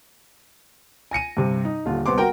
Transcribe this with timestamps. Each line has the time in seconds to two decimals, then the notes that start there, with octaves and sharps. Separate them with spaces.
1.11 G#5 A#6 C#7 D#7
1.37 G2 C3
1.65 D#4
1.86 D#1 D3 F4
2.06 C2 B3 C4 C6 D6
2.18 F#4 A#4 G5